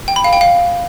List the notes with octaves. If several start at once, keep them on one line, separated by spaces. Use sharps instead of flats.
G5
B5
F5
G5
F5